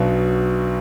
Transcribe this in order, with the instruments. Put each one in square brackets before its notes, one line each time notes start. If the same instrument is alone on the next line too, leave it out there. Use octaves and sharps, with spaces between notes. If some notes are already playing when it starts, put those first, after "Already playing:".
Already playing: [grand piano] B1 B2 F#3 D4